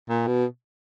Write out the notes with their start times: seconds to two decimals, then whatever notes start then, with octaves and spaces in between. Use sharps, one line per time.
0.09 A#2
0.27 B2